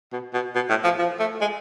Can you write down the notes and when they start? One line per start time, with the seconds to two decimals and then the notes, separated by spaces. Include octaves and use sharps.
0.12 B2
0.34 B2
0.55 B2
0.69 A2
0.84 F3
0.99 F3
1.20 A3
1.41 G#3